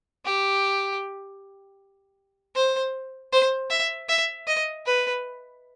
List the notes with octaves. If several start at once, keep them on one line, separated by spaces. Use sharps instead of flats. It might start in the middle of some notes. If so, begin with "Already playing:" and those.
G4
C5
C5
E5
E5
D#5
B4